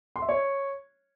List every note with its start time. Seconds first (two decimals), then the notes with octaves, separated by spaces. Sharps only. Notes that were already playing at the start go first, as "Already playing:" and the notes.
0.16 C6
0.22 E5
0.29 C#5